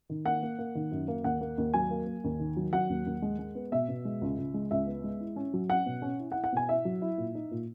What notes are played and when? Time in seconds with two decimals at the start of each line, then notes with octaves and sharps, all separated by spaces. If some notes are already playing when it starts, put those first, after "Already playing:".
0.10 D#3
0.26 A#3 F#5
0.43 A#3
0.59 A#3
0.75 D#3
0.91 F#2
1.08 A#3
1.24 D#2 F#5
1.41 A#3
1.58 D#2
1.74 F#3 G#5
1.91 A#3
2.07 A#3
2.24 D#2
2.39 D#3
2.57 F#3
2.73 F#3 F#5
2.90 D#2
3.06 D#2
3.22 G#3
3.39 G#3
3.55 B3
3.72 B2 E5
3.89 B2
4.05 G#3
4.21 C#2
4.38 C#2
4.54 G#3
4.71 C#2 E5
4.87 B3
5.04 G#3
5.20 E4
5.36 C#4
5.54 F#3
5.70 C#4 F#5
5.86 B2
6.02 C#4
6.19 E4
6.32 F#5
6.35 E4
6.44 F#5
6.52 B2 G#5
6.69 E4 E5
6.85 F#3
7.02 E4
7.18 A#2
7.35 D#4
7.51 A#2